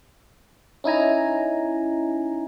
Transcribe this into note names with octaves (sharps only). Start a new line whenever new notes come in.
C#4 D#4 E4 G#5 A#5